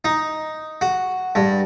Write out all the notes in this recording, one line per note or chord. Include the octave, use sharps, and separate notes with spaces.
D#4
F#4
G2